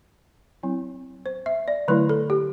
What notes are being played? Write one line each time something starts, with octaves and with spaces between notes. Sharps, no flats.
F#3 C4 E4
C5
E5
D5
D3 F#3 A3 E4 B4
A4
G4